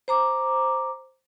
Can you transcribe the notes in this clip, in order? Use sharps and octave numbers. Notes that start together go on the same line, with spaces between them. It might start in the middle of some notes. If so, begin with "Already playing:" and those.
C5 A#5 D6